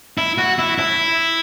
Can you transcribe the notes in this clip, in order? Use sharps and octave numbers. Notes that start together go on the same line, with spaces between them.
E4
F#4
E4
E4